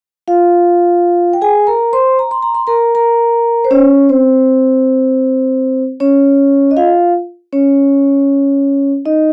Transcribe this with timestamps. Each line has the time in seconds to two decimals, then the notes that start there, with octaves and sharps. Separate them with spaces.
0.28 F4 F5
1.33 G5
1.42 G#4 G#5
1.67 A#4 A#5
1.93 C5 C6
2.19 A#5
2.31 C6
2.43 A#5
2.55 C6
2.67 A#4 A#5
2.95 A#4 A#5
3.65 C5
3.71 C#4 C#5
4.09 C4 C5
6.00 C#4 C#5
6.71 D#5
6.77 F4 F5
7.53 C#4 C#5
9.06 D#4 D#5